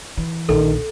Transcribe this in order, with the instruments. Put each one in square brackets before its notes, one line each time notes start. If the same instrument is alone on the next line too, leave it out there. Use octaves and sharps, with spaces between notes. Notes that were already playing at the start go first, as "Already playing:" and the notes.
[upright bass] E3
[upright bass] A#1 [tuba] D#3 [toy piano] A4